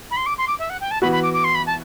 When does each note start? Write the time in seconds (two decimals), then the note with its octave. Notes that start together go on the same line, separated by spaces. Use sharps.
0.11 B5
0.17 C6
0.26 D6
0.38 C6
0.48 D6
0.59 E5
0.70 F#5
0.81 G5
0.91 A5
1.02 E3 B3 F#4 B5
1.12 B5
1.23 D6
1.34 D6
1.44 C6
1.55 B5
1.67 A5